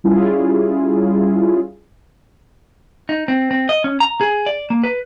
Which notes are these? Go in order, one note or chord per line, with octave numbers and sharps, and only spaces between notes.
G3 C#4 E4 F4 G#4
D#4
C4
C4
D#5
C#4
A#5
G#4
D5
A#3
B4